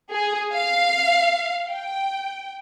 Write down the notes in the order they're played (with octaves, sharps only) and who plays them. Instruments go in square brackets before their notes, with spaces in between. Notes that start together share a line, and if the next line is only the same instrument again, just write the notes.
[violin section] G#4
F5
G5